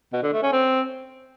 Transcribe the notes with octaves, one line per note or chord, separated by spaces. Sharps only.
B2
D3
A3
C#4
C4